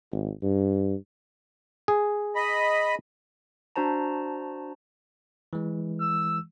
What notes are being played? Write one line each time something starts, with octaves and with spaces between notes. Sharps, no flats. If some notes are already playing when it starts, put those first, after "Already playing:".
G#1
G2
G#4
D#5 B5
D4 F#4 C5 A5 A#5
E3 G#3
E6